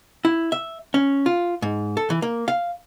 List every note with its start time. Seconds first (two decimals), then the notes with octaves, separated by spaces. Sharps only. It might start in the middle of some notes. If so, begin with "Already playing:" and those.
0.25 E4
0.52 E5
0.94 C#4
1.26 F4
1.62 G#2
1.97 A4
2.10 E3
2.22 A#3
2.48 F5